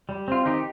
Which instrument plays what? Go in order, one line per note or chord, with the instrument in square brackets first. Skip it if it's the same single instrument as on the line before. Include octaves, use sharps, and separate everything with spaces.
[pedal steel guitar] G3
C4 F4
D#3 D#4 G4